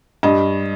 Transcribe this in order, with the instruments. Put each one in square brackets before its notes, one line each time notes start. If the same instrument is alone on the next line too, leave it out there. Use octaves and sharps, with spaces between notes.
[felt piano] G2 D#5